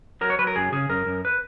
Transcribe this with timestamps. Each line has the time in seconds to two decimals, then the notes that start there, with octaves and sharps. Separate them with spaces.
0.21 F#3 A#4
0.30 C#5
0.39 F#3 B4
0.47 A#4
0.56 F#2 G#4
0.72 C#3 G#4
0.89 F#2 A#4
1.06 F#2
1.25 B4